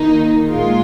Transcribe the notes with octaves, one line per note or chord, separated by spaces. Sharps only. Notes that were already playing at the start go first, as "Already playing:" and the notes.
Already playing: D#3 A#3 D#4
A#2 G#3 F4